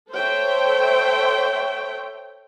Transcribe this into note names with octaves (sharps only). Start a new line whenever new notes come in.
A4 C5 C#5 E5 G5